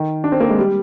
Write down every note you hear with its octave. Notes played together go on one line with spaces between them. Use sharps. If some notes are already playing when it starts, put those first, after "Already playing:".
Already playing: D#3
D4
C4
A#3
G#3
G3